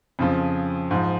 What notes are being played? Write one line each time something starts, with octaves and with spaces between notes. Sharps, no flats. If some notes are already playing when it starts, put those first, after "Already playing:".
F2 C#3 F3
G#2 F3